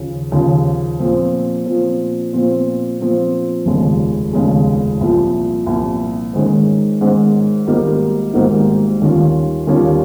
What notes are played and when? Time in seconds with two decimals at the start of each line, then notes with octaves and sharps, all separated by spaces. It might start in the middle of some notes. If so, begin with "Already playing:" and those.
Already playing: D#2 C#3 F3
0.32 D#2 C#3 F3
0.99 A#2 F3 C4
1.66 A#2 F3 C4
2.33 A#2 F3 C4 F4
2.99 A#2 F3 C4 F4
3.66 F1 D#2 C#3 G#3
4.33 F1 D#2 C#3 G#3
5.01 C2 A#2 F3
5.66 C2 A#2 F3
6.33 G#2 D#3 G#3 C#4
7.01 G#2 D#3 G#3 C#4
7.67 G#1 G#2 G3 A#3 D#4
8.34 G#1 G#2 G3 A#3 D#4
9.01 D#2 D#3 G3 C#4 F4
9.67 D#2 D#3 G3 C#4 F4